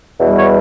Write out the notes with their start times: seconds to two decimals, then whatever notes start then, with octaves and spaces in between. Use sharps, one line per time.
0.19 E2 B2 G3
0.37 C#5